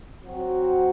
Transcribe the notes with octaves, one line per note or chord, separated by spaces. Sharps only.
F#3 C4 F#4